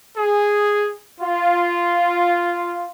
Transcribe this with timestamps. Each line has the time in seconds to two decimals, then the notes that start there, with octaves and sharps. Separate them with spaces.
0.17 G#4
1.21 F4